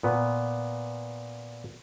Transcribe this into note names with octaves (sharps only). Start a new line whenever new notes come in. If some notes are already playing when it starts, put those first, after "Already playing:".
A#2 B3